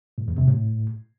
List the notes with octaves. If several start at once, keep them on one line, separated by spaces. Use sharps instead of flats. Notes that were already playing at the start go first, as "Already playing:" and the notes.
A2
E2
C3
A2